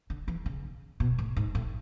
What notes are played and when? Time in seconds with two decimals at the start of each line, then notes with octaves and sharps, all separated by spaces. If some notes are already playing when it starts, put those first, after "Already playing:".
0.10 D3
0.28 E3
0.46 C#3
1.00 B2
1.18 A2
1.36 G#2
1.55 A2